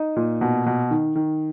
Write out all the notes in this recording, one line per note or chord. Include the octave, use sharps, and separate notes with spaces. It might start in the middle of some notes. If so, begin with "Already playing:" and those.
Already playing: D#4
A#2
B2
B2
D#3
D#3